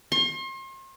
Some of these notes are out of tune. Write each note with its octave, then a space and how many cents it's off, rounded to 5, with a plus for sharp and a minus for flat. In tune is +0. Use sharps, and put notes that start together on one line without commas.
C6 +40